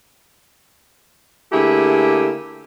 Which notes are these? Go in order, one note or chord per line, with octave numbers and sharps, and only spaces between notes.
D3 A3 A#3 E4 G4 G#4